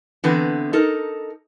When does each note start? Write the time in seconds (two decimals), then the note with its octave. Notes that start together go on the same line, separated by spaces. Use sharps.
0.24 D3 E3 B3 C4
0.73 D#4 A4 A#4